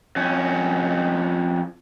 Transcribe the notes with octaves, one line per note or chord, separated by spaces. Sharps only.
F2 C#4